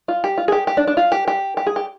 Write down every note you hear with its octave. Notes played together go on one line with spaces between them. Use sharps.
F4
G4
F4
G#4
G4
G4
D4
D4
F4
G4
G4
G4
G#4
G4